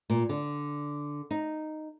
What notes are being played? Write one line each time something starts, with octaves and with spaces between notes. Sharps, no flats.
A#2
D3
D#4